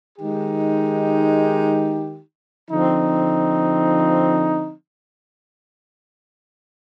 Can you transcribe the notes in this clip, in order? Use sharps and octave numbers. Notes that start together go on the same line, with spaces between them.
D#3 G#3 D#4 G4
D3 F3 C4 D#4